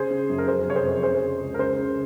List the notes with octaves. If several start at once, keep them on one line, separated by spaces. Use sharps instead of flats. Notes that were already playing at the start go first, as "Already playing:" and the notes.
Already playing: C#3 G#4 C5
C#3
F#2
A#4
F2 G#4 C5
C3 C#5
G#4 C5
F2
C#3 G#4 C5
C#3
C#2
A#4
C#3 G#4 C5
C#3